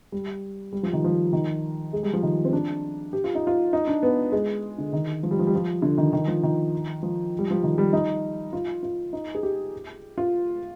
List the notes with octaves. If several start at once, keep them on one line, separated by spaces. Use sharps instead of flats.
G3
G3
F3
D#3
F3
D#3
G#3
G3
F3
D#3
C4
D4
G4
F4
D#4
F4
D#4
D4
B3
G#3
D3
D#3
F3
G3
F3
G3
F3
D3
D#3
D#3
F3
D#3
F3
G3
F3
D#3
G3
D#4
F4
F4
D#4
G#4
G4
F4